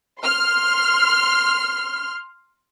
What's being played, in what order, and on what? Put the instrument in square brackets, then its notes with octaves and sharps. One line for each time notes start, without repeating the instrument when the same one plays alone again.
[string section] C6 F6